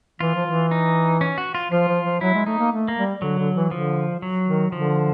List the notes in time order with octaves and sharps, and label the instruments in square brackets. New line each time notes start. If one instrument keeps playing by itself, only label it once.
[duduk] E3 [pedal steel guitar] F4
[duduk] F3
E3
[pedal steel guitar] D#4
C#4
F#4
F4
[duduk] F3 [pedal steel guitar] F4
[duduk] F3
F3
[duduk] F#3 [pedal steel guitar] E4
[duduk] G#3
[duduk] A3 [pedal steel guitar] D#4
[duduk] A#3
A3
[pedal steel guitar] A#3
[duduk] G3
[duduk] D3 [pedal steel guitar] F#3
[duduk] D3
E3
[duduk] D3 [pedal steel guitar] F3
[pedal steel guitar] F#3
[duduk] D#3
[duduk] D3 [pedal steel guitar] F3